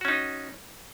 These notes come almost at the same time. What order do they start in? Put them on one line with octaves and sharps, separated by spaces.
F#4 C#4 D#4